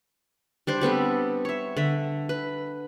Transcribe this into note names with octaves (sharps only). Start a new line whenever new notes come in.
G3 D4 C5
G3 B3 C4 A4
C#5 E5
D3 E5
B4